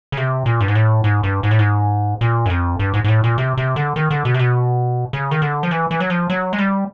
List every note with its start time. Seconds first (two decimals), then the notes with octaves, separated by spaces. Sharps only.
0.12 C#3
0.17 C3
0.46 A#2
0.61 G2
0.68 G#2
0.75 A2
1.04 G#2
1.23 G2
1.43 G#2
1.51 A2
1.59 G#2
2.21 A#2
2.46 F#2
2.50 F2
2.79 G2
2.94 G#2
3.04 G#2
3.08 A2
3.24 A#2
3.38 C3
3.57 C3
3.76 D3
3.96 D#3
4.11 D3
4.25 B2
4.34 C3
4.39 B2
5.13 C#3
5.31 D#3
5.42 D3
5.63 F3
5.71 E3
5.91 E3
6.00 F#3
6.10 F3
6.30 F#3
6.53 G#3
6.58 G3